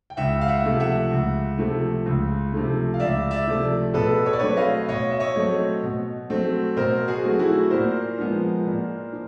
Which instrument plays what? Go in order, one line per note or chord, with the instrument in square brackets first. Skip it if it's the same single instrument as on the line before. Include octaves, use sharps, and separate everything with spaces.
[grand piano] G5
C#2 E5 F#5
F5
E5 F#5
C3 F3 A3
E5 F#5
C#2
C3 F3 A3
C#2
C3 F3 A3
F5
C#2 D5 E5
D5 E5
C3 F3 A3
B2 A4 B4
C#5
D5
F#3 A3 C4 B4 C#5
D#5 F5
B2 C#5 D#5
E5
C#5 D#5
F#3 A3 C4
B2
F#3 A3 C4
B2 A#4 C5
F#4 G#4
F#3 A3 C4
E4 F#4
A#2 A#4 C5
F3 G#3 B3
A#2
F3